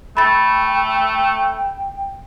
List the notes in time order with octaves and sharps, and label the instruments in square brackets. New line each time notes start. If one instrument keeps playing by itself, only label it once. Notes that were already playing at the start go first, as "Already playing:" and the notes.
[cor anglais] A3 [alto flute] G5 [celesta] B5 A6